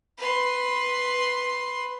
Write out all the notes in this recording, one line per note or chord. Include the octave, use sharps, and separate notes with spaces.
B4 C6